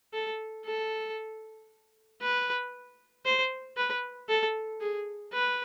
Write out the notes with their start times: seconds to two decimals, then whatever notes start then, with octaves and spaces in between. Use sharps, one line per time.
0.13 A4
0.65 A4
2.21 B4
3.25 C5
3.77 B4
4.29 A4
4.81 G#4
5.33 B4